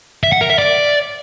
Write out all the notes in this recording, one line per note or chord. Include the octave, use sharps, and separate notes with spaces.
E5
F#5
A#4
E5
D5